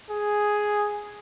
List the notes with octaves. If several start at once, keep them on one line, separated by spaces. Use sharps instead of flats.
G#4